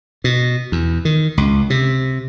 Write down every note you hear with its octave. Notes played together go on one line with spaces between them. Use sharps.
B2
E2
D#3
C#2
C3